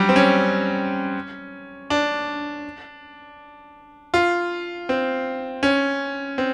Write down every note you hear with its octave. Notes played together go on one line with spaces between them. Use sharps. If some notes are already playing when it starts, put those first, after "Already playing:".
Already playing: F#3 G3
C4
C#4
D4
F4
C4
C#4
C4